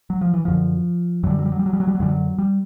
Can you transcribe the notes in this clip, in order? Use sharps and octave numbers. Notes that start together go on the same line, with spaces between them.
F#3
F3
E3
F#2 D3 F3
F#2 D3 F#3 G3
F#3
G3
F#3
G3
F#3
G3
F#3
G3
F#3
F#2 D3 G3
F#3
G3